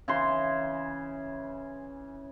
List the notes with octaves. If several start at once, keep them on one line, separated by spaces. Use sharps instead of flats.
C#3 E3 C6